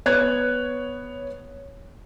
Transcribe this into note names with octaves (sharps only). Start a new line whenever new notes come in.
B3 C#5 F#6 G#6